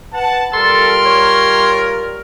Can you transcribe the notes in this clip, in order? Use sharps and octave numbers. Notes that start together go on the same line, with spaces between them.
B4 F#5 A5
G3 F4 A4 A#4 C6
C#5